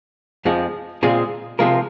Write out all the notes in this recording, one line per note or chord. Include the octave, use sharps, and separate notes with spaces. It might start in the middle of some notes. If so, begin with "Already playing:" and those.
F2 F3 G#3
A#2 G#3 C4 F4 G#4
C3 F3 G#3 F4 A#4